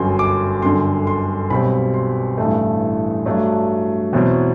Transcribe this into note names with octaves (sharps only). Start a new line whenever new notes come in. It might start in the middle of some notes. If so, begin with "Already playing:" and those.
Already playing: G1 F#2 F#3 C6
D6
G1 F#2 D3 C6
C6
B1 B2 G3 C4 B5
C6
A1 G2 E3 A3
G2 F#3 A3 D4
E2 B2 F#3 C4